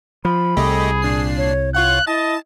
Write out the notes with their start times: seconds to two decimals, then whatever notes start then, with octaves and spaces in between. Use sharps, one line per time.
0.25 F3 B5
0.57 C2 A3 G4 G#4 D#5
1.02 A#2 D4 C7
1.38 C#5
1.75 F4 C#5 F5 F#5 F#6
2.07 E4 D#5 A5 A6